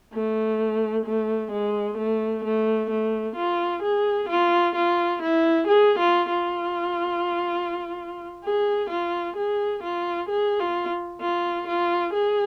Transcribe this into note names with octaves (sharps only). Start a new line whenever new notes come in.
A3
A3
G#3
A3
A3
A3
F4
G#4
F4
F4
E4
G#4
F4
F4
G#4
F4
G#4
F4
G#4
F4
F4
F4
G#4